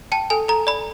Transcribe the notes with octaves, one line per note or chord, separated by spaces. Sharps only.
G5 A5
A4 G#5
A4 A#5
D5 B5